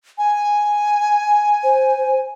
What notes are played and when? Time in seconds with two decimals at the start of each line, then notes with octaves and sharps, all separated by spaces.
0.18 G#5
1.64 C5